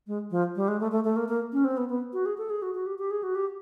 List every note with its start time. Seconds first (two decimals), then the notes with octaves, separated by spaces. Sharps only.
0.07 G#3
0.31 F3
0.56 G3
0.68 G#3
0.80 A3
0.92 A3
1.04 A3
1.16 A#3
1.28 A#3
1.53 C#4
1.65 C4
1.77 B3
1.89 B3
2.13 F#4
2.26 G#4
2.38 A4
2.50 G#4
2.62 F#4
2.75 F#4
2.86 G4
2.99 G4
3.11 G#4
3.23 F#4
3.35 G4